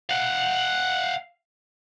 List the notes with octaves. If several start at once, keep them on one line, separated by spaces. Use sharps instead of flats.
F5 F#5